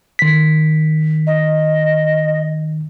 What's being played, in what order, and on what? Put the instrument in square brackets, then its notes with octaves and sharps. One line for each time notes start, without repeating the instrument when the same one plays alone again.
[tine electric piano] D#3 B6
[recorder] D#5